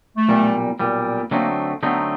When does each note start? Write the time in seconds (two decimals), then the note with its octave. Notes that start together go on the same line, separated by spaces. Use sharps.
0.16 A3
0.29 B1 A#2 G3
0.80 B1 A#2 G3
1.31 D3 F#3 A3 A#3 C4 D#4
1.83 D3 F#3 A3 B3 C4 D#4